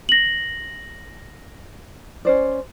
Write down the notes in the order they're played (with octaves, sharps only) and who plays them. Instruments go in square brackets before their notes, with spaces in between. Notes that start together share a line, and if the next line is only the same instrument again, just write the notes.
[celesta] A#6 F#7
[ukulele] C#4 C5 D5